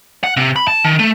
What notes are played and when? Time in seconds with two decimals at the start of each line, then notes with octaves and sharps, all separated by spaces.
0.24 F#5
0.37 C3
0.56 B5
0.68 A5
0.84 D#3
0.99 A3